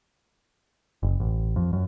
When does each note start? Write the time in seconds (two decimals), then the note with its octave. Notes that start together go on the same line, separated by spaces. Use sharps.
1.03 F#1
1.20 A1
1.56 F2
1.73 F#2